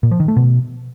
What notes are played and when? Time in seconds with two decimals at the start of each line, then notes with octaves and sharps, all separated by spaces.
0.03 A#2
0.11 F3
0.20 D#3
0.28 A3
0.37 B2